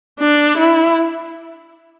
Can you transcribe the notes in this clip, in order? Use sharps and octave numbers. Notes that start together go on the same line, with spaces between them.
D4
E4